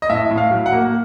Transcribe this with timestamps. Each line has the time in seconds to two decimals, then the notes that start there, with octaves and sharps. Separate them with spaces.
0.02 D#5
0.10 A2 E5
0.31 A2
0.38 F5
0.51 F#3
0.66 F#5
0.72 A#3